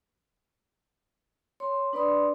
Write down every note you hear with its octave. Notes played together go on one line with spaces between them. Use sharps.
C#5 C6
D4 B4 D5 B5 C6 D#6